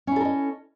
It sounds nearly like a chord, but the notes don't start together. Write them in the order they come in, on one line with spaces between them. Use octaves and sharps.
C#4 E4 A4 A#4 D#5